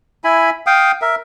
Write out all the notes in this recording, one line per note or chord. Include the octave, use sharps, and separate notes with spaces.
E4 G#5 B5
F5 G5 D#6
A#4 E5